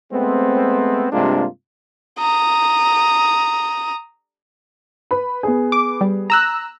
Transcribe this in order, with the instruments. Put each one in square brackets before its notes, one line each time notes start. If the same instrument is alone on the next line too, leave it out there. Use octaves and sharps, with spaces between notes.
[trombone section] G#3 A3 B3 C4
G2 C3 G#3 A#3 D4 F4
[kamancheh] A#5 D#6
[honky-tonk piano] B4 B5
B3 G#4
[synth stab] D6
G3
A#5 E6 F#6